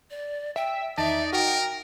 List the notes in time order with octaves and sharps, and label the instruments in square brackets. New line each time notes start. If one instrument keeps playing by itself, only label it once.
[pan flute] D5
[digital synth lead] E5 [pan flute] G5
[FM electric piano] E2 D#3 A5 [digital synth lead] D#4 [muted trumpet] D5 [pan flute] E5
[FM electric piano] F#4 [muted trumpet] A#4 [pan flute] G5